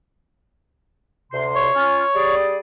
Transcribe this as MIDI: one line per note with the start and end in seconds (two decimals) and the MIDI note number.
1.32 1.68 38
1.32 1.68 48
1.32 1.68 84
1.55 2.35 73
1.75 2.03 61
1.75 2.03 65
1.75 2.03 89
2.15 2.59 55
2.15 2.59 68
2.15 2.59 74